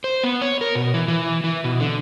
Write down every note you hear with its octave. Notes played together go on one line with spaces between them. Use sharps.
C5
B3
C#5
A#4
B2
E3
E3
E3
B2
D3